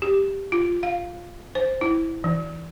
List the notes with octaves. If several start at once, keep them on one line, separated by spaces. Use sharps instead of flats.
G4
F4
F5
C5
E4
E3